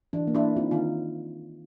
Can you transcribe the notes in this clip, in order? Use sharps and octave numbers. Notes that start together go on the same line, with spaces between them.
E3 D4
A#3
D4 E4
A#3
C4 D#4 F4
D#3 D#4 F4